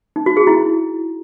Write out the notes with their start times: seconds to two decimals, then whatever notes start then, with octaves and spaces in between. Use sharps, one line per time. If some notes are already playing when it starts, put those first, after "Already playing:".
0.16 D#4
0.26 F#4
0.37 G#4
0.47 E4